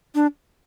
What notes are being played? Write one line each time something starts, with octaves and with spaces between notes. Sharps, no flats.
D4